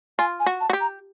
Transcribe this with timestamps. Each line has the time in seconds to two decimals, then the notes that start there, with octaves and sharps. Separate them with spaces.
0.19 F4 G#5
0.40 G#5
0.46 F#4
0.61 A5
0.70 F#4
0.73 G4
0.81 A#5